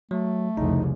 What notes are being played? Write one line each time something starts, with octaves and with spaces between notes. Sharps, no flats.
F#3 A3
F1 C2 C#3 D#4